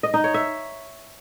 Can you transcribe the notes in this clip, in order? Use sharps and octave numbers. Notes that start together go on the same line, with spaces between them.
D#5
D#4
C#5
E5